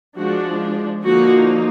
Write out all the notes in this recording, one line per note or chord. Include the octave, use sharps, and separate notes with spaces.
F3 G#3 D4 F#4
D3 F3 A#3 D#4 F#4